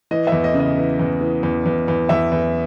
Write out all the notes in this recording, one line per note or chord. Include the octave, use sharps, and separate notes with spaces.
E3 D#5
E5
E2
D#5
C#3
D#5
E3
E2
E3
E2
E2
E2
E2 E5
E2